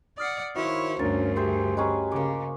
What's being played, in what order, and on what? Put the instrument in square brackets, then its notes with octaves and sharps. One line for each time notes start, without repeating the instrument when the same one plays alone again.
[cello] D5 F#5 [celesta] D#6 F6 C7
[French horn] D#3 [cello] E4 C#5 [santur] F#4 C5 F5
[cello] D2 G2 [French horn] C#4 [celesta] D4 A6 [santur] A#4
[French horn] G4 [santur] G#4 C5 E5
[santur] C#4 G#4 B4 [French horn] G4 [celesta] D#5 A#5
[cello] C#3 [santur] A#3 D6